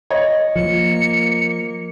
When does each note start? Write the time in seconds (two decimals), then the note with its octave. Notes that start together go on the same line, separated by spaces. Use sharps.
0.10 C#5 D#5
0.56 F3 A#3 C#7